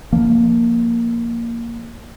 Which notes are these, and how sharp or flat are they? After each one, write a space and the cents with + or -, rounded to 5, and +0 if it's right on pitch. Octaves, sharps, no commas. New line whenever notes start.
F3 +0 A#3 +0